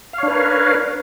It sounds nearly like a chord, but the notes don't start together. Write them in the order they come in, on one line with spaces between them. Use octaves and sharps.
F5 C#5 D4 B4 A#4